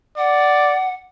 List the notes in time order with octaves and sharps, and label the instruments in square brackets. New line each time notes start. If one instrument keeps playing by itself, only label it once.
[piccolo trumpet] D5 [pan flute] F#5